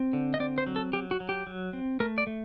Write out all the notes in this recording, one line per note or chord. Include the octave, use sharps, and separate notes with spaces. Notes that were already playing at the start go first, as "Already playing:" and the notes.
Already playing: C4
D3
D#5
C4 D5
C5
F#3
A4
F#3 G4
F#4
F#3
G4
F#3
C4
A3 A#4
D5
A3